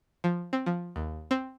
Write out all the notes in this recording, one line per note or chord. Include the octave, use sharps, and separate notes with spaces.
F3
C4
F3
D#2
C4